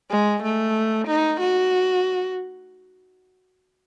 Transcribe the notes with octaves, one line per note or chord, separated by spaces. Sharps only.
G#3
A3
D#4
F#4